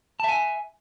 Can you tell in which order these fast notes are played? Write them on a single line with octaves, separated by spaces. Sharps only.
A5 E5 G#5